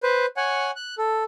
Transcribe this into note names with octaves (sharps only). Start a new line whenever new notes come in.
B4 C5
C#5 F#5 G#5
F#6
A4